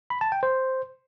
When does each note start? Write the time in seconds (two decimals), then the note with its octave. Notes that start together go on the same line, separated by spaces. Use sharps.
0.10 B5
0.21 A5
0.32 G5
0.43 C5